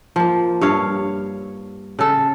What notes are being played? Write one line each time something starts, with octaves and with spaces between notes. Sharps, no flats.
F3 A#3
G2 C#5 F5
C#3 A4